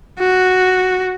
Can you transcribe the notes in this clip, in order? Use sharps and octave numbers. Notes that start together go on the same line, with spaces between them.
F#4